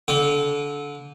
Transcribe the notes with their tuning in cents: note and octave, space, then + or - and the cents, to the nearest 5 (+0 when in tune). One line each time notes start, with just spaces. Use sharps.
D3 -25 F#5 +45